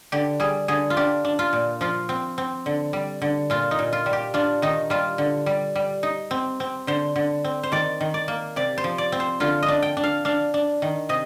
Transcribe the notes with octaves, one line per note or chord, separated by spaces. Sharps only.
D3 G4
G3 G#4
D3 G#4
F4
D4 G4
D4
F4
A#2
F3 F4
C4
C4
D3
G3
D3
A#2 F4
D#4
A#2
F4
G3
G4
D4 F4
D#3 D#4
G3 F4
D3
G3
G3
D#4
C4
C4
D3 C5
D3
C4
C5
D#3 D5
D#3
D5
A#3
C3 D5
C5
F3
D5
C4
C5
D3 F4
D#5
D4
G5
D4
F5
D4 F5
D4
D#3
C3 D#5